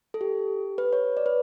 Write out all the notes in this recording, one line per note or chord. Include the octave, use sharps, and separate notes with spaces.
A4
G4
B4
C#5
D5
B4